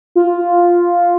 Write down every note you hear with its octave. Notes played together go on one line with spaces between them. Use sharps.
F4